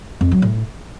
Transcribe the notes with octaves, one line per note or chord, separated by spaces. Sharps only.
F2
F#3
A2